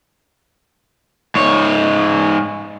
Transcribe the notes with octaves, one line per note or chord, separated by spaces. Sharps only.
G#2 C#5